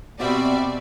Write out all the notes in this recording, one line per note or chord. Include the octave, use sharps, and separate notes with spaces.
B2 G3 C4 F#4 D5 E5 B5